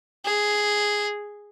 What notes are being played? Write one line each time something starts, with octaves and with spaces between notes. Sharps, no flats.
G#4